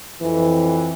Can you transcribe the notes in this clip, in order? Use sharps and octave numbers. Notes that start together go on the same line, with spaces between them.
F2 E3